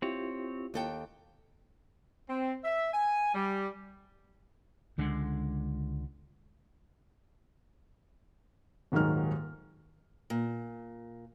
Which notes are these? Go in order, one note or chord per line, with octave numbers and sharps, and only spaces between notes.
C4 E4 F4 G4 C#5
D#2 A4 G5
C4
E5
G#5
G3
C#2 D3 G#3
D#1 G#2 D#3 F#3 D#4 F6
A#2